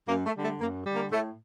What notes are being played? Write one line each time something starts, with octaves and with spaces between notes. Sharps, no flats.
F#2 A#3
A3
D3 G3
A3
F#2 A#3
D3 G3
A#3
A2 A3